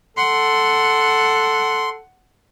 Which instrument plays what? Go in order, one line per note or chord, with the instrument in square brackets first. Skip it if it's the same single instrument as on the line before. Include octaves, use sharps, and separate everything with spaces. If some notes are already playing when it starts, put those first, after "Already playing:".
[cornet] A4 [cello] F#5 [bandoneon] C6